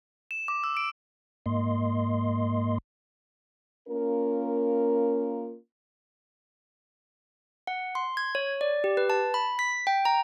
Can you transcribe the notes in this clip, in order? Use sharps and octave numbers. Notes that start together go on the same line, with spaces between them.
E7
D6
E6
D7
G#2 A#3 D#5 C6
A#3 C#4 F4 A#4
F#5
C6
G#6
C#5
D5
G4
B4
A5
B5
B6
G5
A#5